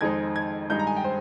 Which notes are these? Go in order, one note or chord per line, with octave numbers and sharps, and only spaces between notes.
F2 D#3 G#3 C4 D#4 G#6
G#6
G2 D#3 G#3 D#4 G6
A#5
G#5
G5
C5